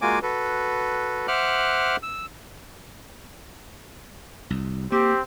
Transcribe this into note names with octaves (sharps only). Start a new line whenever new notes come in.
G#3 A#3 F4 F#4 G#5 D6
F#4 A4 B4
C5 E5 F#5 D6 F6 F#6
E6
C2
A#3 C4 G4